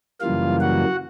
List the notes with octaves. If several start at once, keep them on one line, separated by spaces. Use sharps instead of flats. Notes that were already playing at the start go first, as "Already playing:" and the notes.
F#2 C#3 E3 G3 A#3 F4 F5
F#4 F#5